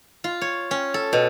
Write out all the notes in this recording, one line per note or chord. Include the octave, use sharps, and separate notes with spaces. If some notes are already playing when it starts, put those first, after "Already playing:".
F4
C#5
C#4
A4
B2